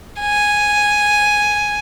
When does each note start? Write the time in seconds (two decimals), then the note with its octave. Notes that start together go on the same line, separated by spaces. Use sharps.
0.20 G#5